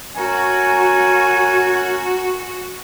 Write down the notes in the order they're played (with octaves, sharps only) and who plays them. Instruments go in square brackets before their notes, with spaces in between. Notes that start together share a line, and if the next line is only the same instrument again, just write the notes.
[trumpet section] C#4 A#4 G#5 [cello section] F#4